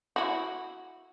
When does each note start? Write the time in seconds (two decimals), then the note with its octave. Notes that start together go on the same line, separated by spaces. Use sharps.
0.16 E4 F#4